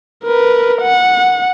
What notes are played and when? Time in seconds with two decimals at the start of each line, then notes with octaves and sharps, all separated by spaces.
0.24 A#4 B4
0.82 F#5